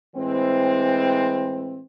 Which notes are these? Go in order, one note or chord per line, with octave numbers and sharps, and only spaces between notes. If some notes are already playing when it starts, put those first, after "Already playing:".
A2 E3 G#3 C4